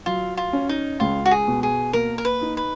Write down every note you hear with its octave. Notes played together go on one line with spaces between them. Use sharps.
F#3 F4
F4
C#4
D#4
C#2 F4
F#4
G#4
B2
G#4
A#3 A#4
A#4
B4
D#4
B4